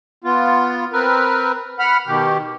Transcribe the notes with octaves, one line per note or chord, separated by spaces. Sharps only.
B3 F4
C4 A#4 B4
F#5 B5 F6
B2 D#3 G4